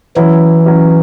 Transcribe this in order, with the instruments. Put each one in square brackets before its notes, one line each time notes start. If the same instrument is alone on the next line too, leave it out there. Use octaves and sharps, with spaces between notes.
[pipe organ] E3 [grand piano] F#3 C#4 E4
[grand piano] F#3 C#4 E4